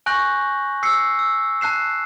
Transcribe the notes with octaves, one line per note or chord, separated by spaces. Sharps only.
G#5 C#6 F#6 G6 A#6 F#7
E6 C7 C#7
E6
A5 F#6 C7 E7